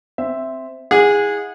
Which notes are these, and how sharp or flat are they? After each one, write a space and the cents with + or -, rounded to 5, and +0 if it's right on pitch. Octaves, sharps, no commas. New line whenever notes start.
C4 -5 E5 +0
E4 -20 G#4 -15 F#5 -30